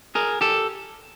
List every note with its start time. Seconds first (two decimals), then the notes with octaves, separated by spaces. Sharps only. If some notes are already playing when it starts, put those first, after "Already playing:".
0.15 G#4 A#4
0.41 G4 A4